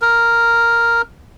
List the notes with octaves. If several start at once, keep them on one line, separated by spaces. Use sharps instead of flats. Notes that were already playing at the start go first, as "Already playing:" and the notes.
A#4